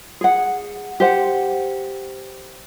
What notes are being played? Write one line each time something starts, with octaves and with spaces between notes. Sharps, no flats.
G#4 F#5
G4 C5 F#5